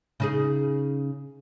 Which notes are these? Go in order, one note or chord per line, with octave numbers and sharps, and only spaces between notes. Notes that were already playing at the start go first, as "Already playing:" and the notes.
C#3 D#4 G#4